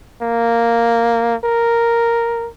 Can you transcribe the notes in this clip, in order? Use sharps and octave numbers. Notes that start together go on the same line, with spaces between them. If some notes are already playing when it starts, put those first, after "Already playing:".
A#3
A#4